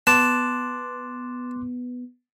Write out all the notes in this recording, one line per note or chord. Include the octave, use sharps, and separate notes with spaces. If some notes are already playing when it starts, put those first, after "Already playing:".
B3 A5 C6 D6 F#6